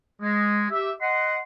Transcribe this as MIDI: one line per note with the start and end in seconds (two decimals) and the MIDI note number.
0.21 0.66 56
0.71 0.92 67
0.71 0.92 76
1.00 1.40 75
1.00 1.40 78
1.00 1.40 84